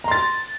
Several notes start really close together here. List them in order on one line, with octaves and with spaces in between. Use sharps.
A#5 C6 A6